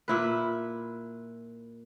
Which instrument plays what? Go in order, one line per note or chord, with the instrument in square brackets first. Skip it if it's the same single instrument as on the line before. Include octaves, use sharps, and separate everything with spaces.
[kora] A#2 E4 B4